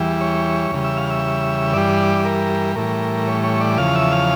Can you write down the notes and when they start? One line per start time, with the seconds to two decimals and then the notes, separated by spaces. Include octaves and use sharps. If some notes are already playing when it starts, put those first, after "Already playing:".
Already playing: E2 E3 G3
0.21 C#5
0.71 E2 C#3 G3
0.84 E5
0.97 F5
1.10 E5
1.73 G2 E3 G3 D5
2.25 A#4
2.75 A2 E3 G3 A#4
3.27 C#5
3.44 C#5
3.60 D5
3.78 E2 C#3 F3 F5
3.95 E5
4.12 F5